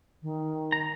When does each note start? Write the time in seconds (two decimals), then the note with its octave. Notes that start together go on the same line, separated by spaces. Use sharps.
0.22 D#3
0.72 A#5